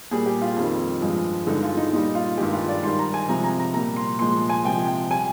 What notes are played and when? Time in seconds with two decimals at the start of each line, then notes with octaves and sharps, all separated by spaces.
0.11 A#2 G3 G#4
0.26 G4
0.42 F4
0.56 F2 D#3 G3
1.01 G2 F3 G#3
1.47 G2 D3 G#3 D#4
1.63 F4
1.77 D#4
1.92 A#2 G3 D#4
2.15 F4
2.37 G2 D#3 G#3 G4
2.53 F4
2.69 D5
2.83 G#2 D#3 G3 C6
2.99 A#5
3.14 G#5
3.28 C3 F3 G#3 A#5
3.44 A#5
3.59 A#5
3.74 A#2 G3 A#5
3.96 C6
4.19 A#2 F3 G#3 C6
4.49 G#5
4.65 C3 F3 G#3 G5
4.87 G5
5.10 G3 G#5